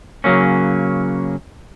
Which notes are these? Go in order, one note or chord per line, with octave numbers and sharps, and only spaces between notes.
C#3 F#3 A#3 C#4